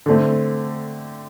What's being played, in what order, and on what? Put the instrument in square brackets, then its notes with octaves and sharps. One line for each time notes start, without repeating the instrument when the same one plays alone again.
[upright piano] D3 A3 C4